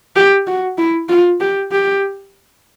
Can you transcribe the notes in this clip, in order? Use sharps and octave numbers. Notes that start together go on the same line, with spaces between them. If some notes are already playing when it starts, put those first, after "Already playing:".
G4
F#4
E4
F4
G4
G4